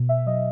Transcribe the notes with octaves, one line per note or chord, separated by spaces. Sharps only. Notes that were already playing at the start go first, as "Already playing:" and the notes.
Already playing: B2
E5
F#3 D#5